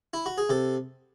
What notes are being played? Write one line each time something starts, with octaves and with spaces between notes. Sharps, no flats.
E4
F#4
G#4
C3 A4